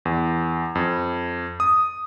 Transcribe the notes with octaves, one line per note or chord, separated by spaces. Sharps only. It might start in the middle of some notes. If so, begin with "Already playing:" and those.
E2
F2
D#6